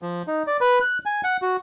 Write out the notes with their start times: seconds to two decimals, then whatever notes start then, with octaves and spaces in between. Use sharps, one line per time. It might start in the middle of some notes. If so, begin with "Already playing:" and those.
0.02 F3
0.27 D#4
0.47 D5
0.61 B4
0.81 F#6
1.06 G#5
1.24 F#5
1.42 F#4